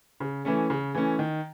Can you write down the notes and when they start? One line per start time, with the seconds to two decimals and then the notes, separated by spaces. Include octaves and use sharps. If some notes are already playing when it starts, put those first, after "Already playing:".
0.20 C#3
0.45 E3 A3 C#4
0.70 C#3
0.95 E3 A3 C#4
1.19 D#3